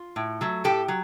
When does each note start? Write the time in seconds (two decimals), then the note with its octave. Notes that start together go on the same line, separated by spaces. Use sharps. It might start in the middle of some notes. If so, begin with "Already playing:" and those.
Already playing: F4
0.16 A2
0.41 F#3 A3
0.64 A2 G4 A4
0.88 F#3